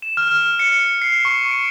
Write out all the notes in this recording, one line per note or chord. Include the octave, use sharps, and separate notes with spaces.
E7
F6
C#7
C7
C#6
D7